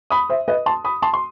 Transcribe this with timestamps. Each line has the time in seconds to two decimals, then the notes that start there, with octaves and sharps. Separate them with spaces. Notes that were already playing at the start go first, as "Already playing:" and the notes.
0.10 B5 D#6
0.29 C5 E5
0.48 B4 D#5
0.66 A5 C6
0.85 B5 D#6
1.02 A5 C6
1.13 C6